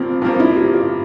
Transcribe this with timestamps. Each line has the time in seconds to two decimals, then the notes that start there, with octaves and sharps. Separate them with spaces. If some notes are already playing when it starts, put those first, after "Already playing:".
Already playing: G2 F3 A#3 C4
0.22 G2 F3 A#3 C4
0.40 E4
0.56 G4
0.73 F4